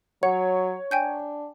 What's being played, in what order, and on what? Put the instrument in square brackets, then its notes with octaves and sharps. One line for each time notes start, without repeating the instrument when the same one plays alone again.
[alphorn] F#3 [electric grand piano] C#5 [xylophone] F#5
[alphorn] D4 [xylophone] G5 G#5 G6